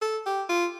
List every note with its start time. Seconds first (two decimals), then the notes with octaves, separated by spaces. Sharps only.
0.02 A4
0.26 G4
0.49 F4